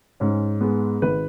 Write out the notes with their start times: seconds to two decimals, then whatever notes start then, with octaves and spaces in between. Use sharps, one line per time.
0.20 G#2 C#4
0.61 G#3 B3
1.02 G#1 B4